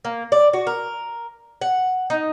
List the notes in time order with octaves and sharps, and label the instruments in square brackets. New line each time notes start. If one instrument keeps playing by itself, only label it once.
[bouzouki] A#3
D5
F#4
A#4
F#5
D#4